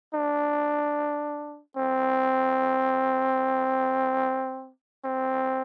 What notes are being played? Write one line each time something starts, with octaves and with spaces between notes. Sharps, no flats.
D4
C4
C4